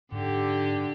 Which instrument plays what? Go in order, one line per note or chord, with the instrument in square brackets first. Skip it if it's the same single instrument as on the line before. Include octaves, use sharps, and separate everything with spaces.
[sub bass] G#2 [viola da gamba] D3 G4